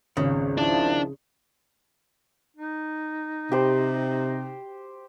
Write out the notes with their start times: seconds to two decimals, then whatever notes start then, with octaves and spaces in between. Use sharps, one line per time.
0.17 G#1 C#2 C#3
0.58 D#3 F3 D4 E4
2.56 D#4
3.52 C3 G4 C5